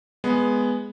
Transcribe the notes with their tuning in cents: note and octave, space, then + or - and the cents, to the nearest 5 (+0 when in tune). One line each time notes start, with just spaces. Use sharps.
G#3 +0 B3 +0